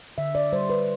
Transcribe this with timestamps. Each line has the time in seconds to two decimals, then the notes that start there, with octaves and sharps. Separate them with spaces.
0.18 D3 E5
0.35 D5
0.53 G3 C5
0.70 B4